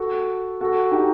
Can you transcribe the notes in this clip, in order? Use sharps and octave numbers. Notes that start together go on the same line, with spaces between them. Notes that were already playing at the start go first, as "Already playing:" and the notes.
Already playing: F#4 A4
F#4 A4
D#4 G4